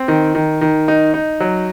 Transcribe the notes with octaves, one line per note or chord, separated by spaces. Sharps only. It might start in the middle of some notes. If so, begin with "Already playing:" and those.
Already playing: C4
D#3
D#3
D#3
D#4
D#4
F#3